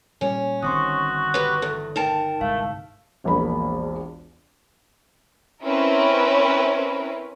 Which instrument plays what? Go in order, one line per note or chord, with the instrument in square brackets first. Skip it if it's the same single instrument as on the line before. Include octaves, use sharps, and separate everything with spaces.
[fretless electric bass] A#2 G3 [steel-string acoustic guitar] C#4
[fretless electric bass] G1 D#3 C4 [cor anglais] F#4 [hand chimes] C6 C#6 D#6
[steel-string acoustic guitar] G4 B4
[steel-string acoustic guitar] E2 [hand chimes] A4
[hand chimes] D#4 G5 [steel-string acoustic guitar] A#4 A5
[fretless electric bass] G1 C2 G#2 [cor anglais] A3 [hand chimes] F5
[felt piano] E1 A#1 A#3 B5
[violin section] C4 C#4 E4 A#4 B4